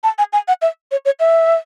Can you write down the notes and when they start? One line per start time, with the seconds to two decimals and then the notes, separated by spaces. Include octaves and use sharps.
0.04 A5
0.18 G#5
0.33 G#5
0.48 F#5
0.62 E5
0.91 C#5
1.05 C#5
1.20 E5